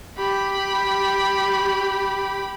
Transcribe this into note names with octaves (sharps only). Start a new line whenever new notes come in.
G4 B5